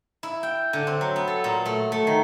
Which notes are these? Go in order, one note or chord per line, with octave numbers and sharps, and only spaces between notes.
E4
G5
D3
C4
F#3
B3
A4
A#2
A3
A3
D#3